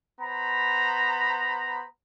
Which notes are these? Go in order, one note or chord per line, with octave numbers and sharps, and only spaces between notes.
B3 C5 A#5 B5